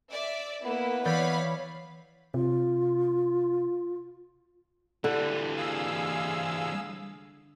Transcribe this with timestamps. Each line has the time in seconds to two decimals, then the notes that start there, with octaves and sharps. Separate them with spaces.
0.11 D5 E5
0.64 A#3 B3 E4
1.05 E3 C#5 D5 F5 B5 G6
2.34 C3 F4
5.04 D3 E3 G3
5.56 G#4 F5 E6